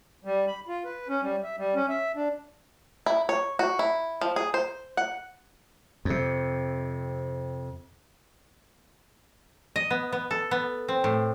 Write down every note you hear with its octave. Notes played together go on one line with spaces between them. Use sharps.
G3
B5
F4
B4
C#4
G3
E5
G3
C#4
E5
D4
E4
C#5
F#4
E4
F3
G#4
C5
F#5
F2 C3
D#5
B3
B3
A4
B3
C4
A2